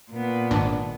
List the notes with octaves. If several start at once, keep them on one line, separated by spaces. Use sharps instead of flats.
A#2 B3
G#1 D4